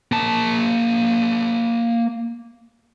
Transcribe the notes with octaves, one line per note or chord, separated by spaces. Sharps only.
A#3 A5